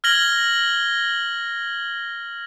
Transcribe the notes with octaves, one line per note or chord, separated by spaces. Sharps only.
F6 G#6 A#6 F#7 G7